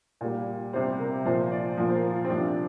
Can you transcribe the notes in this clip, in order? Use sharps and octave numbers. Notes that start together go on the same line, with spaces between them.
A#2 G3
C3 G3 C5
A#4
A#2 F3 C5
D5
A#2 F3
C5
A#4
F4
C4
C3 F3 D4